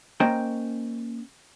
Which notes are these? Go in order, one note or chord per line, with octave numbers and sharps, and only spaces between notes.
A#3 C#4 C5 D#5 G5 A#5